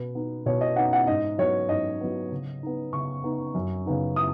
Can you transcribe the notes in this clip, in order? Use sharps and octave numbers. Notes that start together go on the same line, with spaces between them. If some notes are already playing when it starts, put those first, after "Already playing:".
Already playing: B2 B4
B3 D#4
B2 C#5
D#5
B3 D#4 F#5
F#5
G#2 D#5
F#3 B3 C#5
G#2 D#5
F#3 B3
C#3
B3 D#4
C#3 C#6
B3 D#4
F#2
C#3 B3 D#4
D#6